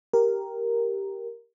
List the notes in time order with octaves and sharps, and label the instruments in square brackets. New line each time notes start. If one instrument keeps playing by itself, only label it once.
[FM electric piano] G4 A#4